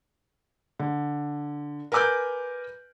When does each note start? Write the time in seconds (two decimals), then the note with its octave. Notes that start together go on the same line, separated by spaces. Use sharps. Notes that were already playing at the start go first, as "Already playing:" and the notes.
0.79 D3
1.92 A#4 B4 G#5 D6 F#6 G6